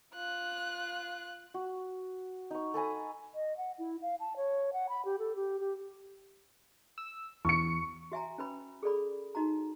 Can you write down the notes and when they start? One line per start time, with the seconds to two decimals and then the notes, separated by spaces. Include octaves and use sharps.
0.15 F4 F#6
1.54 F#4
2.51 D#4 C#6
2.74 A4 B4 G#5 A#5
3.35 D#5
3.57 F#5
3.78 E4
4.02 F5
4.20 A5
4.37 C#5
4.73 F#5
4.89 B5
5.05 G4
5.19 A4
5.36 G4
5.60 G4
6.98 E6
7.45 E2 C#6 C#7
8.12 F#4 E5 G#5 A#5
8.38 C#4 B4 B5
8.83 G#4 A4 D5 B5
9.35 D#4 F#4 A#5